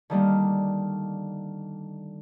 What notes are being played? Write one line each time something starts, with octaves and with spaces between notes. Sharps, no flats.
D3 D#3 G3 A#3